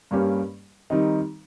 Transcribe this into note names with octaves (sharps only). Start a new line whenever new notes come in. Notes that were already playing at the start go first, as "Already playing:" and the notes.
G2 G3 A#3 C#4 G4
D#3 G3 C4 D#4